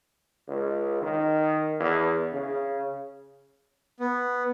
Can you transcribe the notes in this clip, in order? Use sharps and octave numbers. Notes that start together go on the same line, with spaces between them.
C#2
D#3
E2
C#3
B3